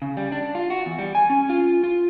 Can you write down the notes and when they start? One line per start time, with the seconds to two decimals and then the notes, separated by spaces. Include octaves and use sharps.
0.02 C#3
0.17 G3
0.32 D4
0.55 F4
0.70 F#4
0.86 E2
0.99 G3
1.15 G#5
1.30 C#4
1.50 F4
1.84 F4